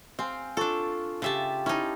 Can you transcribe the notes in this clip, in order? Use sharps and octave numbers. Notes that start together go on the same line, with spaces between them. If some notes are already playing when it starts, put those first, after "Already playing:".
C4 F5 G#5
D4 F4 A4 C#6
C#3 F4 G4 E5 A5
C#4 D#4 E4 A5